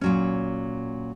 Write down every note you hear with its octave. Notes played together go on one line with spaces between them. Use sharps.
A#2 F#3 C#4